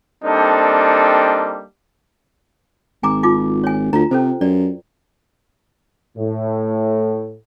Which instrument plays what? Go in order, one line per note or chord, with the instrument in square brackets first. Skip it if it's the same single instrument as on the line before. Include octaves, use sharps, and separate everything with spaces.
[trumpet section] G3 A#3 C4 D4 D#4 A4
[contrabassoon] G#1 [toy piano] G#5 A#5 D6
[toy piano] D#4 F4 D6
C#5 G#5
[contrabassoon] D2 [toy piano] F4 A#5
[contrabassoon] C3 [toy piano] C#4 A4 C5
[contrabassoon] F#2 [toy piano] D5
[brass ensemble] A2